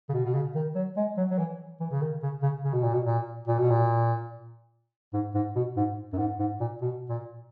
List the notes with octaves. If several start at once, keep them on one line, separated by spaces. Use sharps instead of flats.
C#3
B2
B2
C#3
D#3
F#3
G#3
F#3
F#3
E3
E3
C#3
D#3
C#3
C#3
C#3
B2
A#2
B2
A#2
A#2
B2
A#2
G#2
G#2
B2
G#2
F#2
G#2
G#2
A#2
B2
A#2